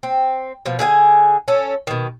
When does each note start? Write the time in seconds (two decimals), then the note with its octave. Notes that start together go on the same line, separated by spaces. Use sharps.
0.03 C4
0.66 B2 F3
0.79 D3 G#4 F5 G#5
1.48 C#4 A4
1.87 B2 D#3